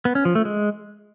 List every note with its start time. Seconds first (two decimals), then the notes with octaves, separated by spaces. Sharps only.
0.05 B3
0.15 C#4
0.25 F3
0.35 A3
0.45 G#3